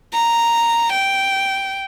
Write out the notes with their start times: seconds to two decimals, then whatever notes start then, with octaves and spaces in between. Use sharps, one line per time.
0.14 A#5
0.93 G5